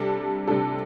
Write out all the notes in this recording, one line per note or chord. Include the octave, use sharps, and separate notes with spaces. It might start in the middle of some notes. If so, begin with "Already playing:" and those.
Already playing: C3 G3 D4 A4
C3 G3 D4 A4